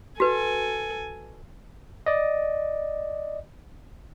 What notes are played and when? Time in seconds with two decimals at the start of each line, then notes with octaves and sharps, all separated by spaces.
0.20 F#4 A4 B4 G#5
2.06 D5 D#5